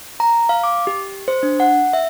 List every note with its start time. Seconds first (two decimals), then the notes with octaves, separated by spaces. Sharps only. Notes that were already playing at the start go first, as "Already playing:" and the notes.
0.20 A#5
0.49 F5
0.64 D6
0.87 G4
1.28 C5
1.43 D4
1.60 F#5
1.93 E5